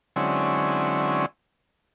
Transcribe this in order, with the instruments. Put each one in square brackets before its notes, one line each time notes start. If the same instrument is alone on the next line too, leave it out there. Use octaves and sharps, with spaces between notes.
[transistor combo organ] D3 F#3 G#3 C4 C#4 E4